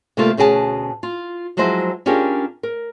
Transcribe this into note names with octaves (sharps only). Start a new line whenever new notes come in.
C3 G3 A3 A#3 F4 A4
D2 B2 C#4 G#4 G5 A5
F4
F3 F#3 G#3 E4 C5 D#5
C#4 D4 F4 G4 G#4 A#4
A#4